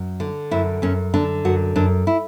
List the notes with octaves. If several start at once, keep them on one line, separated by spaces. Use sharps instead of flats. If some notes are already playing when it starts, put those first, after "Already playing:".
Already playing: F#2
D3
F#2 E4
F#2 C#4
D3 D4
F#2 F#4
F#2 D4
E4